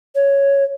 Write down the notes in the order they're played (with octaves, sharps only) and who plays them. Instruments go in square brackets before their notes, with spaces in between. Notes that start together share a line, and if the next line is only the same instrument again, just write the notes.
[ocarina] C#5